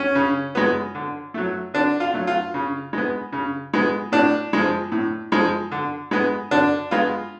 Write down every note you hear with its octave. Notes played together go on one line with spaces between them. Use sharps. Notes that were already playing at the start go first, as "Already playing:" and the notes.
Already playing: C#4
C#3
G#3 B3
D3
F#3 A3
D3 D4
F4
F#3 A3
F4
C#3
G#3 B3
C#3
G#3 B3
A2 D4
F3 G#3
A2
F3 G#3
D3
G#3 B3
D3 D4
G#3 B3 F4